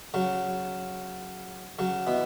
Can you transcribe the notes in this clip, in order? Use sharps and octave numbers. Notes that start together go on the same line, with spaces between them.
C#3 F#3
C#3 F#3
B2 E3